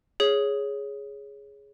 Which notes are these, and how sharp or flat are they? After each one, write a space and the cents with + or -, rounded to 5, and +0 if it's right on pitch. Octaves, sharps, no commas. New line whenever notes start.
G#4 +0 C#5 +0